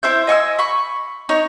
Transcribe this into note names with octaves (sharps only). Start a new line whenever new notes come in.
E4 C5 E5 G6
D#5 G#5 C#6 E6
B5 C#6
D#4 C#5